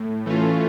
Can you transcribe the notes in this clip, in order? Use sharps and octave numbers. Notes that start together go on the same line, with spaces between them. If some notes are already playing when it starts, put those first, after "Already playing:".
Already playing: A2
E3 A3 C#4 F4